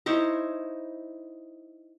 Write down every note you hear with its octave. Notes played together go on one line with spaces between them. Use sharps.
D#4 E4 C5 C#5